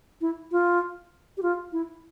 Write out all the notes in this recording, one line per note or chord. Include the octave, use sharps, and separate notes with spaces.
E4
F4
G4
F4
E4